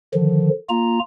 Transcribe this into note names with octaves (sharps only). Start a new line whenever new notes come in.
D3 D#3 F3
A#3 F4 A#5